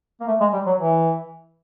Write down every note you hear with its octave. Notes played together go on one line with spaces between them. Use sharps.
A#3
A3
G#3
G3
F#3
E3